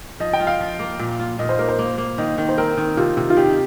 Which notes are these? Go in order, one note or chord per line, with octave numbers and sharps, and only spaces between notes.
F3 D#5
G5
F4
F5
F3
A#3
A#2
F4
A#2 D#5
C5
A#3 A#4
C5
A#3
A#3
D#3 D#5
D#3
C5
C4 A#4
D#3
C3 F4
C3
F4
D#3 G4